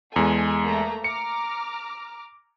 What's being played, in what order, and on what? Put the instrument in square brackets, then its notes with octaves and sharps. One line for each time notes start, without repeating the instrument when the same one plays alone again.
[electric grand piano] E2 G#3 [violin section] A4 G#5
[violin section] A3 A#3 A#5
[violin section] A#5 D6 F6 [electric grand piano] C#7